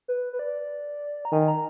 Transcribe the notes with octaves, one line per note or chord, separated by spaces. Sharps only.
B4
B4
D5
A#5
D#3 G#5
A#5